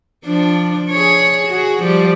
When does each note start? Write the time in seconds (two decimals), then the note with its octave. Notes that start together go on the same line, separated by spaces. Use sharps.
0.25 F3 D4
0.91 G#4 C#5
1.48 F#4 G#4
1.81 F3 G3